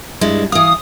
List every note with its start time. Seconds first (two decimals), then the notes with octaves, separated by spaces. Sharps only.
0.21 G2 G#3 E4
0.52 E3 F5 D#6